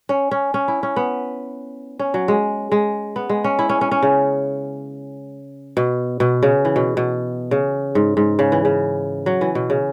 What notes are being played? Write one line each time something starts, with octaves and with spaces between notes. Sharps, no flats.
C#4
C#4
C#4
E4
C#4
B3
C#4
F#3
G#3
G#3
B3
G#3
C#4
E4
C#4
C#4
C#4
C#3
B2
B2
C#3
E3
B2
B2
C#3
G#2
G#2
C#3
E3
C#3
F#3
E3
B2
C#3